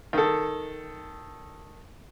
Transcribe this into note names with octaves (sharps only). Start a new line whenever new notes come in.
D#3 A4